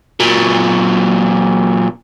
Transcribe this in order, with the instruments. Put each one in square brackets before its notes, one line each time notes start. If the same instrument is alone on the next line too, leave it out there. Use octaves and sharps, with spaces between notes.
[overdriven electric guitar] A#2 F#3